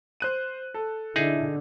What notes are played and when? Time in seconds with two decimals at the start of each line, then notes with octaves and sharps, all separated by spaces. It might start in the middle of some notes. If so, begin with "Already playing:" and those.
0.20 C5 F#6 D#7
0.74 A4
1.16 D3 D#4 E4 G#4